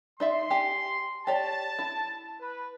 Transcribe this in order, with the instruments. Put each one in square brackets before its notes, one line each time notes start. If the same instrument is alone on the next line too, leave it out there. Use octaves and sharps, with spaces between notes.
[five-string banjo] D#4 D5 E5 [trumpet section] C6
[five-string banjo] G4 G#5
[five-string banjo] G4 C#5 D5 [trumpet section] A5
[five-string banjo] E4
[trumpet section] B4